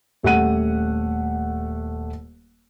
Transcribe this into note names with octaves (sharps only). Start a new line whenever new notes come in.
D#1 A3 G4 F#5 D#7